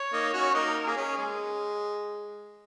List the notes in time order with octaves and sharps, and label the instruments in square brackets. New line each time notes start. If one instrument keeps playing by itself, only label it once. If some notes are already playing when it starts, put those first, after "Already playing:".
Already playing: [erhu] C#5
[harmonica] A#3 D#4
C#4 F#4
[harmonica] A#3 D#4 [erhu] A#4
[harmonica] A#3 [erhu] G#4
[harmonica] C#4
G#3